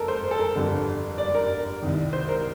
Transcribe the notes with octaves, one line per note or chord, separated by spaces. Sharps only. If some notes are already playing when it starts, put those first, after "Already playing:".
Already playing: F2 A4 A#4
C5
A4
A#4
G1 F2 D3 G3
D5
A#4
C2 C3 D#3
C5
A#4